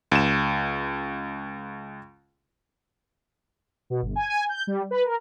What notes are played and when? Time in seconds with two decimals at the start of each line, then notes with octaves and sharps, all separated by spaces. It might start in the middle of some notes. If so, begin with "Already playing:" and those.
0.12 C#2 E7
3.90 B2
4.02 G1
4.16 G#5
4.30 G#5
4.49 G6
4.67 G3
4.91 B4
5.06 A#4